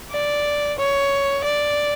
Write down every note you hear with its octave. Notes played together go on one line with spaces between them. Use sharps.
D5
C#5
D5